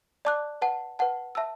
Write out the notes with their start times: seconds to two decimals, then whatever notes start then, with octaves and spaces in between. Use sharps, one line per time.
0.25 D5 A5 D6 F#6
0.62 B4 F#5 A5
0.99 B4 F#5 A5
1.35 E5 A5 E6